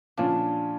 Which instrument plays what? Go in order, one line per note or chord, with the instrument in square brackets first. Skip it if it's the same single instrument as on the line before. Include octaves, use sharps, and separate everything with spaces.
[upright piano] A#2 F3 C#4 F4 [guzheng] D4